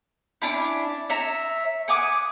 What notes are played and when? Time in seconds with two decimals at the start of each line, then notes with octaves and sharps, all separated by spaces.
0.42 C#4 D4 E4
1.10 C#5 E5 A#5
1.88 F#5 G#5 D6 D#6